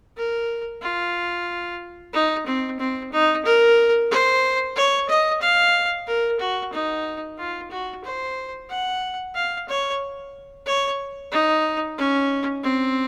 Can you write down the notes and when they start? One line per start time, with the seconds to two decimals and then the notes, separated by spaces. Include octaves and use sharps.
0.17 A#4
0.82 F4
2.13 D#4
2.46 C4
2.79 C4
3.12 D#4
3.45 A#4
4.11 C5
4.76 C#5
5.09 D#5
5.41 F5
6.07 A#4
6.40 F#4
6.73 D#4
7.38 F4
7.71 F#4
8.04 C5
8.70 F#5
9.35 F5
9.68 C#5
10.66 C#5
11.32 D#4
11.98 C#4
12.63 C4